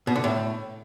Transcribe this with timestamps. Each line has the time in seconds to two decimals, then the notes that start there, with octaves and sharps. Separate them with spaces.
0.07 B2
0.16 D3
0.24 A2